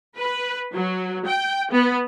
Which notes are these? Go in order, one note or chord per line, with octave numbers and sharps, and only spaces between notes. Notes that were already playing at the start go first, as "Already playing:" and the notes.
B4
F#3
G5
B3